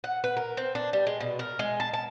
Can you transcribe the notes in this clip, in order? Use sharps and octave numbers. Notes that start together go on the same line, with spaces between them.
F#5
B4
A#4
C4
D4
G3
G#3
B2
A#4
G#3
A5
A5